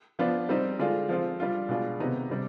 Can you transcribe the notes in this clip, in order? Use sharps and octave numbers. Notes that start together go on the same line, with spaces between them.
F3 B3 D4 F4
G3 C4 D#4
D3 G#3 D4 F4
F3 C4 F4
G3 D4 F4
B2 G#3 D4 F4
C3 D#3 B3 D#4
C3 G3 D4